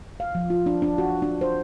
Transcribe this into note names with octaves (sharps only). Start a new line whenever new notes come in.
F5
F3
F4
D4
D4
F#4
D4
C5